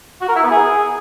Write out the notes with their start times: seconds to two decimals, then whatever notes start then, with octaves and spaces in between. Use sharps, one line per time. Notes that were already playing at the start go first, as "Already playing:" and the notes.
0.21 F#4
0.28 A#4
0.36 E4
0.43 B3
0.50 G#4